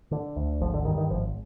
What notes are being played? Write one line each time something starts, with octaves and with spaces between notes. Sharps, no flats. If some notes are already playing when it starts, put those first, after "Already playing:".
D3
D2
G#1 F3
D3
G2 D#3
D#3
G#1 F3